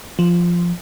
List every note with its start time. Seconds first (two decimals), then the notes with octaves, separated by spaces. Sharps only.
0.19 F3